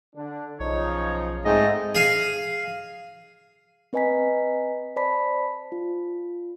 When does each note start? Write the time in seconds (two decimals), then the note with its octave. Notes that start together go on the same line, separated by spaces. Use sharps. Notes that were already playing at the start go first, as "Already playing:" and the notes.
0.16 D3 D4
0.60 B1 C#3 F3 D#4 C#5
1.45 G#2 G#3 A3 C4 D#5
1.95 G#4 F5 G#5
3.93 C4 B4 D#5 G#5 A#5 B6
4.96 C5 D5 A5 B5 B6
5.72 F4